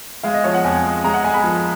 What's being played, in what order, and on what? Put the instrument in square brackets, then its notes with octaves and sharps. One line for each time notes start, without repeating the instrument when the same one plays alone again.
[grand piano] G#3 [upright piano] F5
[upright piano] D#5
[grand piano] F3 [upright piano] C#5
[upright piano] F#5
[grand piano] F2 [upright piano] G#5
[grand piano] G#3
[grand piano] G#3 [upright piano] A#5
[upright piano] F#5
[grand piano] G#3 [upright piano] G#5
[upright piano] B5
[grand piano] F3